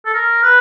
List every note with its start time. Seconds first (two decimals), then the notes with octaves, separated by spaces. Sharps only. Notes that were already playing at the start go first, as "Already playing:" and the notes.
0.06 A4
0.14 A#4
0.43 B4